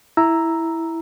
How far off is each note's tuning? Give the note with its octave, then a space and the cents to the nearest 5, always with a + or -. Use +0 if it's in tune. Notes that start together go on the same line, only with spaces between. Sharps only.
E4 +0 A#5 +0 E6 +0